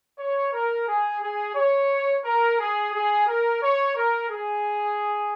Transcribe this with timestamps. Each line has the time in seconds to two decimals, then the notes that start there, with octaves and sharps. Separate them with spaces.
0.19 C#5
0.53 A#4
0.88 G#4
1.22 G#4
1.56 C#5
2.25 A#4
2.59 G#4
2.93 G#4
3.28 A#4
3.62 C#5
3.96 A#4
4.30 G#4